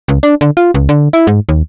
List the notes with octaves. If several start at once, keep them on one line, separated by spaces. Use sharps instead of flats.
C#2
D4
D3
F4
C#2
D3
E4
G#2
D#2